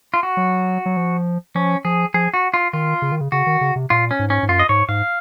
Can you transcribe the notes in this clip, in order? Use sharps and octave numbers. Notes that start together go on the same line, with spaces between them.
F4
F#4
F#3
F#3
F3
F3 C#4
F3 G#4
F3 G#4
F#4
F4
D#3 F4
C#3
D#3
C#3
C#3 F#4
D#3
C#3
C3
A#2 F4
C#4
G#2
C#4
G#2
F#2 F4
D#5
G#2 C#5
G#2 F5